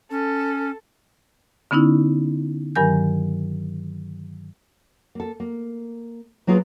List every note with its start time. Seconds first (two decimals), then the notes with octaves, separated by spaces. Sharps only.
0.11 C#4 A4
1.71 D3 B3 C#4 D#4 E4
2.76 G2 D#3 F#3 A#4 G#5 G6
5.15 A#3 A4
5.40 A#3
6.47 F#3 A#3 F4 G#4 A4 B4